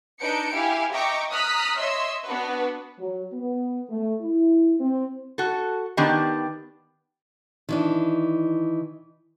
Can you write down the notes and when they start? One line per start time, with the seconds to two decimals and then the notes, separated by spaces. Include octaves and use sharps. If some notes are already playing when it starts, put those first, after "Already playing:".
0.21 D4 D#4 B4 G6 C#7 D7
0.53 E4 G4 F5 G#5
0.93 D#5 E5 G5 A#5 C#6 D6
1.32 A#5 D#6 F6 F#6 B6
1.77 C#5 D#5 E5 C6 E6
2.26 B3 D4 F#4 B4
2.99 F#3
3.33 B3
3.90 A3
4.21 E4
4.81 C4
5.38 F#4 A4
5.97 D#3 B3 D4 G4
7.69 D#3 E3 D4